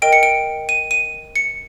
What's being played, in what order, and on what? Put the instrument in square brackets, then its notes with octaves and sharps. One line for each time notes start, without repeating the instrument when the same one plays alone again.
[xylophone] A#4 D#5 G5 D7
C#7
D7
D#7
D#7
C#7